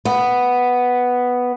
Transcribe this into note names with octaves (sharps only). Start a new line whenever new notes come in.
B3